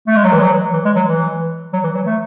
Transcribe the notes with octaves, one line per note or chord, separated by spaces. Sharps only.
A3
G#3
F#3
E3
F#3
E3
G#3
F#3
E3
F#3
E3
F#3
A3